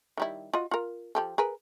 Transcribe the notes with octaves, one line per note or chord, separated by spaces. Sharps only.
D#3 G3 E4
F4 F#4 D#5
F4 A#4
F3 G4 A4
G#4 A#4 B4